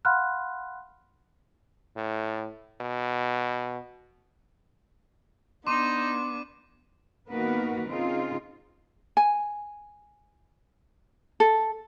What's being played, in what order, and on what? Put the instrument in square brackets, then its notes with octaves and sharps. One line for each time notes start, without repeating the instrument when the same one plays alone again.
[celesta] F5 F#5 B5 C6 F6 F#6
[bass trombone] A2
B2
[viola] B3 D4 [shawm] D#4 [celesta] C6 [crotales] D6 D#7
[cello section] D#3 A#3 B3 F#4 A#4 B4
C#3 C4 D#4 F4 G#4
[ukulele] G#5
A4